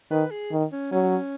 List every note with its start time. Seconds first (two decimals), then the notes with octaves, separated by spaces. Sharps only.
0.11 D#3 B4
0.31 G#4
0.52 D#3
0.72 C#4
0.92 F#3 C#4